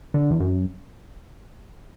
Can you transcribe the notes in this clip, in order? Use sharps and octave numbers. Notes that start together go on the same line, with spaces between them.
D3
E2
F#2